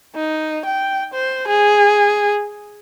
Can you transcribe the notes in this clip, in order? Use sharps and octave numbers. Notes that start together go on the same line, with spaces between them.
D#4
G5
C5
G#4